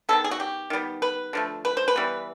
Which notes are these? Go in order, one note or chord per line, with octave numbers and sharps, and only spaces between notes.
D#3 G#3 B3 A4
G#4
F#4
G4
D#3 G3 B3
B4
D3 F3 A3
B4
C5
B4
E3 G3 B3